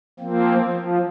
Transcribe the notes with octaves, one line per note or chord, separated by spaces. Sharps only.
F3 A#3 C4
F3